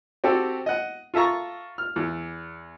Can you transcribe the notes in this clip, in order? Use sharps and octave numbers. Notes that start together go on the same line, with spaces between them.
C4 F#4 G4 A4
D#5 F#5
F4 A4 E5 A#5 C#6
F6
E2